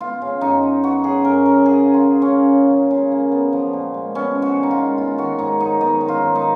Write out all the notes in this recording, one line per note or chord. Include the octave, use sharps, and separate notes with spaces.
B3 F4
C#3
F#2 D#4
F#3
B3 F#4
C#3 G#4
F#2 A#4
F#3 A#4
C#3 G#4
F#3
F4
C#3
C#4
A#3
C#3
F#3
C#3
A#3
B3
F3
A#2
G#3
B3 C#4
F3
F#4
A#2
D#4
F4
G#3
B3 F4
D#3 F#4
G#2 D#4
F#3 D#4
B3 D#4
D#3
F4
G#2
D#4